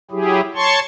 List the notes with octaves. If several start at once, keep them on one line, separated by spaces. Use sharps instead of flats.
F#3 E4 G4 G#4
C#5 A5 C6 C#6